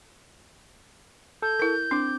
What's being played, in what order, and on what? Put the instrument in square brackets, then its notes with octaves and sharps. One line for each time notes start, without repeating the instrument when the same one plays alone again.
[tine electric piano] A4 [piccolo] G6
[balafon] E4 A#4
[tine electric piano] C4 D6 [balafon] D4